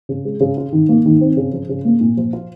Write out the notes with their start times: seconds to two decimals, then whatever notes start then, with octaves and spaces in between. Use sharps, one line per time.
0.09 C#3
0.25 G#3
0.40 C#3
0.57 F4
0.73 D#3
0.89 A#3
1.06 D#3
1.21 C4
1.37 C#3
1.53 F3
1.69 C#3
1.85 A#3
2.01 A#2
2.17 F3
2.33 F4